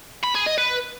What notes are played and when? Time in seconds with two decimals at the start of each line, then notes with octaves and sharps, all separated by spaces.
0.24 B5
0.35 G#4
0.47 D#5
0.58 B4